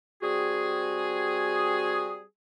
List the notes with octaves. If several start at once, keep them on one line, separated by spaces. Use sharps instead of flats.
G3 C4 F#4 G#4